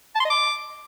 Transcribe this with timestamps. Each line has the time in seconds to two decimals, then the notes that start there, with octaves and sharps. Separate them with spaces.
0.15 A5
0.20 C6
0.25 D#5
0.30 D6